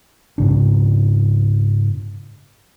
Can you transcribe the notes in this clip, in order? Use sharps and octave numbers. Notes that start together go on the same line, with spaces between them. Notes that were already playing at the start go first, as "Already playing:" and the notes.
G#2 C#3 D4